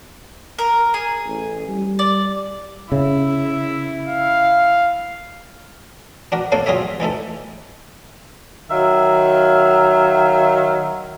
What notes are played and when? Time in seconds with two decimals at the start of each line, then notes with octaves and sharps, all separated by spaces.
0.59 A#4
0.94 G#4
1.26 A1
1.68 G3
1.99 D5
2.92 C#3 E4 E5
4.08 F5
6.32 D4 F#4 A#4
6.52 A#3 D4 A4 C#5 F5
6.66 F#3 F4 G#4 A#4 C#5 E5
7.00 E3 D#4 E4 A4
8.69 D#3 F#3 E5 F5